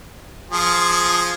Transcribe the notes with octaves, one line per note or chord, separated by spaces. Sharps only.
F3 G#4